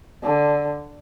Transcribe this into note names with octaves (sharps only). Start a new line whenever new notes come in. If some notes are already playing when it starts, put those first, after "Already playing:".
D3